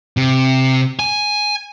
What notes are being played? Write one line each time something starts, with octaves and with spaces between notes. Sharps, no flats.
C3
G#5